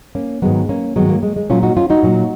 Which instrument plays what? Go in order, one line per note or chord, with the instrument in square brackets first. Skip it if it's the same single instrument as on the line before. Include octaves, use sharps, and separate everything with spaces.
[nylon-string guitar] A#3 C#4
G#2 D#3 F#3 G#3 B3
A#3 C#4
G#2 D#3 F#3 G#3 B3
A#3
G#3
G#3
A#2 F#3 C#4 F4
D#4 F#4
C#4 F4
D#4 F#4
A#2 F#3